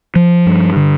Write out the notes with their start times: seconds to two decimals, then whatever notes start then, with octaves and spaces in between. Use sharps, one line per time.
0.16 F3
0.46 G2
0.76 D3